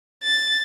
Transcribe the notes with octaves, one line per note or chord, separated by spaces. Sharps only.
A6